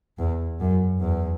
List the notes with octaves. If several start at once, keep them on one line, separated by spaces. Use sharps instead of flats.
E2
F#2
E2